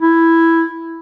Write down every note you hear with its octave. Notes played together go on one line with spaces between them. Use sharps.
E4